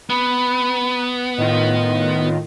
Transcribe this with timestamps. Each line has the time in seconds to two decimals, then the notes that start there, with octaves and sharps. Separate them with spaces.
0.10 B3 B5
1.38 A2 D#3 F4 D#5